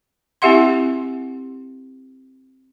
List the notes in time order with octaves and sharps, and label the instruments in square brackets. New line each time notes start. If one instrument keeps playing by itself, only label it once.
[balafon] C4 E4 G4 E5 F#5 C6